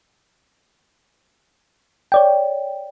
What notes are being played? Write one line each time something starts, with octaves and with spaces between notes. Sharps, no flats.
C#5 D5 G5